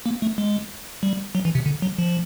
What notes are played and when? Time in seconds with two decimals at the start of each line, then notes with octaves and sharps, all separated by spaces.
0.06 A#3
0.22 A3
0.38 G#3
1.03 G3
1.35 F#3
1.45 E3
1.55 C3
1.66 D3
1.82 F#3
1.99 F3